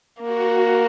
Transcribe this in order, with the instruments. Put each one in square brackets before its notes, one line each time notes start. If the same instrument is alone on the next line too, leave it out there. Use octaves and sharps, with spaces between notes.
[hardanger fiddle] A#3 [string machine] F#4